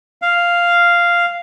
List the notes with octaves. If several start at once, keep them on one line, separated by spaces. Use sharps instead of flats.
F5